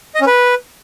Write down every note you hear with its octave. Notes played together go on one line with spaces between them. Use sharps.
D#5
C#4
B4